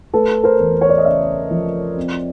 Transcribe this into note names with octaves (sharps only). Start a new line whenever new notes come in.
A3 A4 B4
A#4 C5
E2
C#5
D5
D#5
C#3 D5 E5
F3
C4